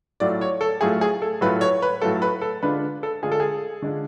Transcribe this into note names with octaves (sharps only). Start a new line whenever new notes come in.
A2 F#3 A3 F4 D5
C#5
A4
A2 F#3 A3 F4 G#4
G#4
A4
A2 F#3 A3 F4 B4
C#5
B4
A2 F#3 A3 F4 A4
B4
A4
D3 G#3 D4 F4 B4
A4
D3 G#3 D4 F4 G#4
A4
G#4
D3 G#3 D4 F4